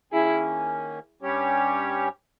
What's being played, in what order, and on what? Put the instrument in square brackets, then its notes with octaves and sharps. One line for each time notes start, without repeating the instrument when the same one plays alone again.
[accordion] D#3 A#3 C#4 [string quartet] E4 G#4
[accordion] G2 G3 C#4 G4 C#5